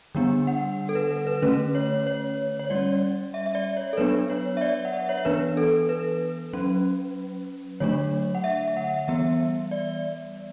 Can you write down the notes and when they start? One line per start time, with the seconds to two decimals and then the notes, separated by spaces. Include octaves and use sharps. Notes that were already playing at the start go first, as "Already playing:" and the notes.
0.15 D3 G3 B3 D4
0.47 F#5
0.89 A4
0.95 B4
1.11 B4
1.27 B4
1.42 D3 A3 C#4 B4
1.75 C#5
2.07 C#5
2.59 C#5
2.70 G3 C#4 D5
3.34 E5
3.46 E5
3.55 D5
3.77 C#5
3.93 A4
3.97 F#3 B3 D4 B4
4.30 C#5
4.57 E5
4.61 D5
4.85 F#5
4.93 E5
5.09 C#5
5.25 E3 B3 D4 B4
5.57 A4
5.89 B4
6.53 F#3 C#4
7.80 D3 F#3 A3 D4 C#5
8.35 F#5
8.44 E5
8.68 E5
8.77 F#5
9.08 E3 G3 B3 E5
9.71 D5